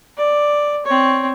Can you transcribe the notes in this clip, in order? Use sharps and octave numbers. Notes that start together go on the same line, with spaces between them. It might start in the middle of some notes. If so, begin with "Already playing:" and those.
D5
C4 C#5